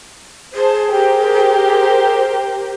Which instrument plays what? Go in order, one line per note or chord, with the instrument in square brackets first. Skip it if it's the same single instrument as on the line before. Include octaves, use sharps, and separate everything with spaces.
[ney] G#4 [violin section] C5 A5
[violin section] G4 A#4 C5